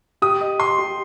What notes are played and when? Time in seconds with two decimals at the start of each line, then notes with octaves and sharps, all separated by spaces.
0.22 G4 D#6
0.41 D#5
0.60 D#5 C6
0.78 G4